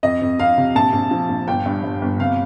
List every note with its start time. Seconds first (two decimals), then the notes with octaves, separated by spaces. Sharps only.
0.03 F2 D#5
0.22 F2
0.39 F2 F5
0.58 C3
0.75 A#1 A5
0.93 A#1
1.11 F3
1.29 A#1
1.47 G1 G5
1.66 G2
1.84 G2
2.02 G1
2.19 C3 F5